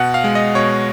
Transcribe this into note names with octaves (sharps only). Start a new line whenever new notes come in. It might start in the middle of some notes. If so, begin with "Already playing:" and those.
Already playing: B2 F#5
F5
G#3
D#5
B2 C#5